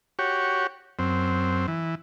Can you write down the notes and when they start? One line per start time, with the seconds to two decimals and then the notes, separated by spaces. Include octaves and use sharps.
0.19 F#4 G4 C#5
0.99 F#2 C4
1.68 E3